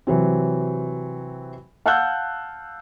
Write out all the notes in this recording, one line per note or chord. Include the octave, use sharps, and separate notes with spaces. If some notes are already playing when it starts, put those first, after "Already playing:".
C3 E3 F#3 C4
F5 F#5 A5 E6 F#6 G6